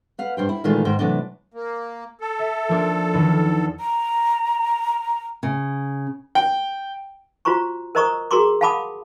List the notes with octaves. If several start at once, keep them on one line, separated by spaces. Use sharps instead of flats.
B4 F5 F#5
G2 C5 G5
E4
A#2 D#3 E3 G#3 A3 F4
G#2 D#3 A#4 C5
C3 E3 F#3 A3 D4
A#3
A4
E5 E7
F3 A#3 D4
E2 D#3
A#5
C#3
G5
F4 F#4 C5 A#5 C#6
A#4 C5 D#5 A#5 C#6 D#6
F#4 G#4 A#4 A#5 C6 D6
F5 F#5 A5 B5 D6 D#6